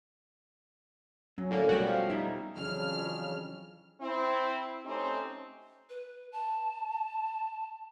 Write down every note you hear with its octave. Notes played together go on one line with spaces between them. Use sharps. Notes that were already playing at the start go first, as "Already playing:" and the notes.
F#3 C#4
A2 D3 A#3
B2 G3 A3 F#4 C#5 D5 G5
F3 F5
G3 D#4 E5
F2 C#3 E3 F#3 D4 F6
C4 E4
A3 C4 C#4 D#4 G4
B4
A5